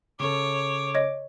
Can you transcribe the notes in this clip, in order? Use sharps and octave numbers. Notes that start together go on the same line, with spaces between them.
C#3 A4 C#5 D6
C#5 D#5